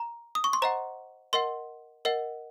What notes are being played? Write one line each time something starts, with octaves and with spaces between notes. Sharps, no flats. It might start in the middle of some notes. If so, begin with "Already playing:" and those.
Already playing: A#5
D#6
C#6
C6
C5 D#5 F#5 A#5
A#4 D#5 F#5 C6
A#4 D#5 F#5